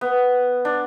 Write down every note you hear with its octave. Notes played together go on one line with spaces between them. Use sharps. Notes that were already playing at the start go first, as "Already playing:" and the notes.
B3
D4